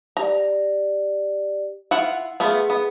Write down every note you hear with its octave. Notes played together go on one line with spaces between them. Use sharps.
G4 D5 A#5
E4 F4 F#5
A3 B3 F4 G#4 B4
B3